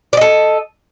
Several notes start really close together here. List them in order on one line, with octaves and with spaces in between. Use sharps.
D5 D#5 A4